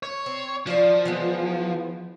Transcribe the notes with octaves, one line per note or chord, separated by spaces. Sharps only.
C#5
C4
F3 C5 D5
E3 G#3 B3